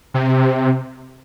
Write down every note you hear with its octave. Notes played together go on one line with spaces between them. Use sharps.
C3